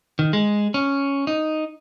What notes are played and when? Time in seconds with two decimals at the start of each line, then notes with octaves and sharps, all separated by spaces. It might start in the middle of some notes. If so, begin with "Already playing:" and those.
0.19 D#3
0.33 G#3
0.74 C#4
1.27 D#4